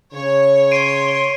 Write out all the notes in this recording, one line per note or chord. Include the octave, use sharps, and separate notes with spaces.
C#3 C#5
C6 C7 D7 D#7